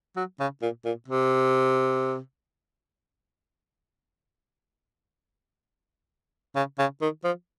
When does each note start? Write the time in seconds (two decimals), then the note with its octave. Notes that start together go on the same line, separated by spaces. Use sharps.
0.16 F#3
0.40 C#3
0.62 A#2
0.85 A#2
1.08 C3
6.55 C#3
6.79 C#3
7.01 D#3
7.24 F3